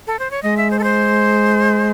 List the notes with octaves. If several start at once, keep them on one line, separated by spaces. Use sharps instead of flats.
A4
C5
C#5
G#3 D#5
E5
C5
A4
C5